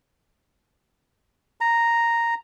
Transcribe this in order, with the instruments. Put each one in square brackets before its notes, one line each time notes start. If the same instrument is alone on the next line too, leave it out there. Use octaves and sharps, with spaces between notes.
[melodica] A#5